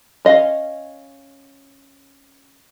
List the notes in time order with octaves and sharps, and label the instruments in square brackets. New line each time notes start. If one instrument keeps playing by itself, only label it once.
[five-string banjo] C#4 D#5 F5